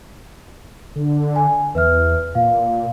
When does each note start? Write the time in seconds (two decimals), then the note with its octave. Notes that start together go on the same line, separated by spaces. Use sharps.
0.96 D3
1.36 G#5
1.75 E2 B4 E5 F6
2.35 A#2 F5